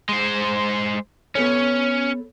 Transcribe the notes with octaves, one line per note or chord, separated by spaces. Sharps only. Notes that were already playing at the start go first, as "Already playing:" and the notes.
G#3 C5
B3 C#4 A4 C#5